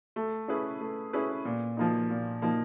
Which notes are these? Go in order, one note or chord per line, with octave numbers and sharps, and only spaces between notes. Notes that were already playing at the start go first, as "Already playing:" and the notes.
A3
C#4 E4 G#4 B4
A3
C#4 E4 G#4 B4
A#2
F3 A#3 D#4
A#2
F3 A#3 D#4